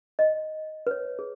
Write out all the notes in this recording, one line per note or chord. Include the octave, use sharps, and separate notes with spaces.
D#5
B4
C#5
G#4